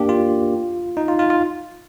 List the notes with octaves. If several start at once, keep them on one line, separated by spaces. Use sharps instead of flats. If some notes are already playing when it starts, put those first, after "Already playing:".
Already playing: A#3 D4 G4
F4
D#4
F4
F4
F4